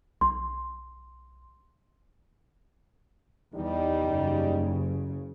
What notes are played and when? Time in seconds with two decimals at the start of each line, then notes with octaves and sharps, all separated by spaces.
0.21 B1 C6
3.54 E2 G3 D#4
4.03 F#1 C#3